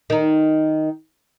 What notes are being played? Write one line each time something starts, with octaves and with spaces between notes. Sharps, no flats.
D#3 D#4